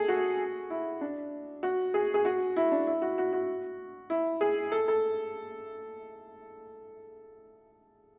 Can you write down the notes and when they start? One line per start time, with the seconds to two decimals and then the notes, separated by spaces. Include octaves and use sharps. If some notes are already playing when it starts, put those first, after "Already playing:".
Already playing: G#4 A4
0.08 F#4
0.70 E4
1.01 D4
1.63 F#4
1.94 G#4
2.14 G#4
2.25 F#4
2.56 E4
2.72 D4
2.87 E4
3.02 F#4
3.18 F#4
3.33 F#4
4.10 E4
4.41 G#4
4.72 A4
4.88 A4